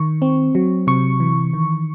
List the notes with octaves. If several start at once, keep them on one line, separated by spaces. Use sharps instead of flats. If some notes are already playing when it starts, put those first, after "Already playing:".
Already playing: D#3 C#6
C4
F#3
C3 C#6
E3
D#3